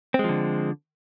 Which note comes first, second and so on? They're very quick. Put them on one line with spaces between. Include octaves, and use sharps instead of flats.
C4 G#3 F3 D3